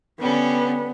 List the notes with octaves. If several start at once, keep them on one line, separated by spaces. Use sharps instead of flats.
D3 G3 B3 C#4